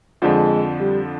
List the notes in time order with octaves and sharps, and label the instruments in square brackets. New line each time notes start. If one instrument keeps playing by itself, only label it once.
[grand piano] F2 D3 F3 [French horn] G#3
[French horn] G3